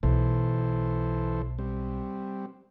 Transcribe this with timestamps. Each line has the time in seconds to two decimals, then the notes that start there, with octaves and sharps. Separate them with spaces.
0.03 B1 E3 A4 C5
1.59 G3 C4